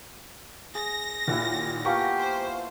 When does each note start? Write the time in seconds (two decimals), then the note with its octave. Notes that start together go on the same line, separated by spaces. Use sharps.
0.75 G#4 A#6
1.28 D#2 A#2 D#3 E4 F#5
1.85 A#3 B3 F4 G4 G#5 A5 C#6
2.18 C5